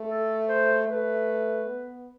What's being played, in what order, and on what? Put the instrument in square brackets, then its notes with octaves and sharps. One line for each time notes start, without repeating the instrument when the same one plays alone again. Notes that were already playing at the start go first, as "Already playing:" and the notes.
Already playing: [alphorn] A3
[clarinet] A4
C5
[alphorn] A3 [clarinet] B4
[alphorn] B3